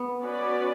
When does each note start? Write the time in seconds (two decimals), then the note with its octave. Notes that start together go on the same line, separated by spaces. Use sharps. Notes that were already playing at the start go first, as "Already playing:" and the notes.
Already playing: B3
0.22 C#4 F#4 B4 D5